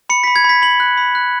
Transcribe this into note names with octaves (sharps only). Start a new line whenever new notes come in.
B5 C#7
B5 B6
G#6
B5 B6
B5 F#7
F#6
B5
F#6